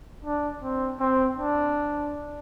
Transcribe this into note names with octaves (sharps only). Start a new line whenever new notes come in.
D4
C4
C4
D4